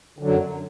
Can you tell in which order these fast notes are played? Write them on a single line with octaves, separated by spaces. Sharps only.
D3 F#3 F#2